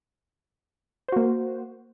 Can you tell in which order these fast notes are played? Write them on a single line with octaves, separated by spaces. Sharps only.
C5 F#4 A#3